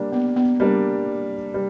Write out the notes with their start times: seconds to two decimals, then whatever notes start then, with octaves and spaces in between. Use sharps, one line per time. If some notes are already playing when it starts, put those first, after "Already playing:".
Already playing: G3 A#3 D4
0.12 B3
0.36 B3
0.60 G3 A#3 D4
1.54 G3